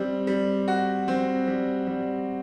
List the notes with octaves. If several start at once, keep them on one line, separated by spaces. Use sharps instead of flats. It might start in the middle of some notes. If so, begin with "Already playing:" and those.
Already playing: G3 C4
G3
F#4
C4
G3
G3